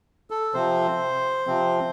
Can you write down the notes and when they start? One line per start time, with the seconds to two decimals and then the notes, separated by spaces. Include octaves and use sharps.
0.30 A4
0.54 C3 F3 C4 C5
1.47 C3 F3 C4